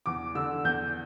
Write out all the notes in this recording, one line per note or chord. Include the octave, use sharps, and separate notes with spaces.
E2 D6
D3 E6
E2 G6